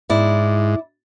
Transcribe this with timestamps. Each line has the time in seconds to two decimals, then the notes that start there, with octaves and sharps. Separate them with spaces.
0.10 G#2 E4 D5